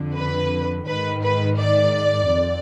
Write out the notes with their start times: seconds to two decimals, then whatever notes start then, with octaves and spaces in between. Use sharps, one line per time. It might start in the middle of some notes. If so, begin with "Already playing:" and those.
Already playing: F2 D3
0.16 B4
0.87 G#2 D#3 B4
1.22 B4
1.58 D5
2.29 F2